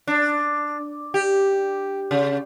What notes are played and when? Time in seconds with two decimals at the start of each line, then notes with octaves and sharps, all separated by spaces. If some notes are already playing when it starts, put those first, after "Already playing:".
0.08 D4
1.14 G4
2.11 C#3